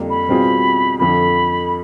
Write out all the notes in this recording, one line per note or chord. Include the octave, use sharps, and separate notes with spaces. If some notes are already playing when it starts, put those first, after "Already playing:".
Already playing: F2 D3 G3 A#3
B5
B2 G3 C4 F4 G#4
F2 D3 F3 B5